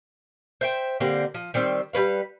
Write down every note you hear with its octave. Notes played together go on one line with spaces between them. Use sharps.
C5 E5 G5
D3 G3 A#3 C4
F3
D#3 G3 C4
G3 A#3 B4 F5